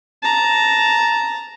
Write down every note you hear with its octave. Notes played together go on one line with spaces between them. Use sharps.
A5 A#5